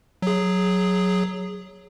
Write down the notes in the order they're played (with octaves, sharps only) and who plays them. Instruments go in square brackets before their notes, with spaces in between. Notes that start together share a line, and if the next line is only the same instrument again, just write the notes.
[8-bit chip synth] F#3 G#4